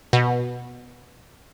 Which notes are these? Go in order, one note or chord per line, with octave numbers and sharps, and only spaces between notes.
B2